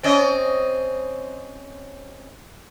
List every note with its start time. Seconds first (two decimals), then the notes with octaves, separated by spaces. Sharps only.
0.03 C4 C#4 D#5